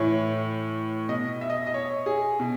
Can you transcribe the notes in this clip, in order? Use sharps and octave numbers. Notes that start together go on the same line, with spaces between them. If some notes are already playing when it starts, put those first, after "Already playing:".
Already playing: A2 E3 C#5
B2 D#5
E5
D#5
D#5
C#5
G#4
B2